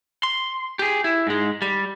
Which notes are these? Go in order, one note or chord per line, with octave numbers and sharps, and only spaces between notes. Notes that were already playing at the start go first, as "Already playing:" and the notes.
C6
G4 G#4
E4
G#2 G#3
G3